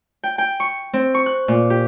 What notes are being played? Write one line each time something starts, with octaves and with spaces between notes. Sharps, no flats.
G5
G5
C#6
C4
C#6
F#6
A#2
G4